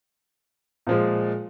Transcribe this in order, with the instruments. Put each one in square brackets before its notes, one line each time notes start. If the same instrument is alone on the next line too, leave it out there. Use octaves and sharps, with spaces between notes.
[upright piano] A#2 F3 G#3